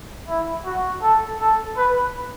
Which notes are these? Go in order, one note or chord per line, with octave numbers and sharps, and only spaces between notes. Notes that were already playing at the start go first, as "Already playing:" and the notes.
E4
F#4
A4
A4
B4